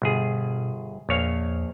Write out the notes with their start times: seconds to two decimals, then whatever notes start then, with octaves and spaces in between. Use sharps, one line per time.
0.02 G1 B2 G#4
1.09 A#1 E2 C#5 F5